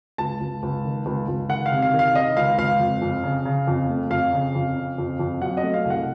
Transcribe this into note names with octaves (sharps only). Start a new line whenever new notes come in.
C#2 A5
C#2
C#2
D#3
C#2
C#2
D#3 F#5
F5
C3
F5
D#3
F5
D#3 D#5
C#2 F5
C#2 F5
F2
F2
C#3
C#3
F2
A3
F2 F5
C#3
F2
C#3
F2
F2
F#3 F#5
D#5
A3
F5
C2
F#5